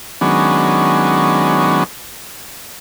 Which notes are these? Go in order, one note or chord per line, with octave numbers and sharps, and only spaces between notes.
D#3 F#3 G#3 B3 C#4 D4